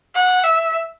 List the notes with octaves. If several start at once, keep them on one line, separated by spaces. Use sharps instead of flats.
F#5
E5